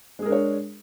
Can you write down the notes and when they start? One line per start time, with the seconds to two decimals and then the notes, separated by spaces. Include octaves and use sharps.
0.19 G#3
0.22 G#4
0.26 A#4
0.29 D4
0.32 C#5